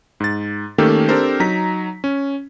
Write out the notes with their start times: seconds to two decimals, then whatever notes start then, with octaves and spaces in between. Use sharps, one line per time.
0.20 G#2 A6
0.78 D#3 A3 A#3 C#4 G4 A4
1.09 C4 D4 G4 A4 A#4 C5
1.40 F#3 D#4 A#5 B6
2.04 C#4